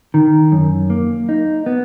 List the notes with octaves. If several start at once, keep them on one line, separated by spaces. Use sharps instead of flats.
D#3
F#2
A#3
D#4
B3